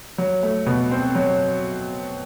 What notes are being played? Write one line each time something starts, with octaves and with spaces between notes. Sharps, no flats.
F#3
A3
B2
C4
F#3